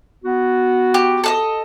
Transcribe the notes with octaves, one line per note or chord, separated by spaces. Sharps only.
B3 F#4
G4
A4 D5 D#5